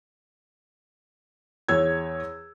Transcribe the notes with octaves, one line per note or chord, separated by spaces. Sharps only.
E2 C#5 E6 G#6